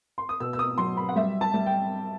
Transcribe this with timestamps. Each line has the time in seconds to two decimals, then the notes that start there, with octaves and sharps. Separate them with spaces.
0.18 C6
0.29 D#6
0.40 B2 E6
0.53 E6
0.59 D#6
0.78 F#3 C6
0.97 B5
1.09 F#5
1.16 G3 E5
1.41 A5
1.54 G3
1.66 G5